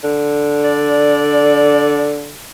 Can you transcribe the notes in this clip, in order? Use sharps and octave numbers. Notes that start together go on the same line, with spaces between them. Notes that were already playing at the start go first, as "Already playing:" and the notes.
D3
D5